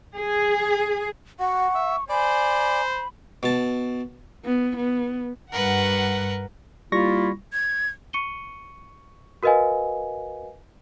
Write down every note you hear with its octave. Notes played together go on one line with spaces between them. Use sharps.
G#4
F#4 F#5 C#6
E5
C5 D5 G#5 B5
B2 A5
B3
B3
G2 A#4 B4 F#5
G3 A#3 E4 F4 C#6 A#6
G#6
C#6 C#7 D#7 G7
F#4 A#4 B4 D#5 F5 G#5